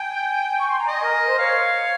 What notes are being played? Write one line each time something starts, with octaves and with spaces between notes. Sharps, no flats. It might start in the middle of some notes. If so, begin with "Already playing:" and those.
Already playing: G5 G#5
C#6
C6
A#5
D#5 G#5
A#4
A#4
C5
C#5 F5